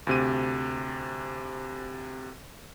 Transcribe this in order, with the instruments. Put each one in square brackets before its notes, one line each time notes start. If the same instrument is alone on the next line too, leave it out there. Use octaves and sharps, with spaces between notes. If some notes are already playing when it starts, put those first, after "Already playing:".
[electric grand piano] D2 C3 D#7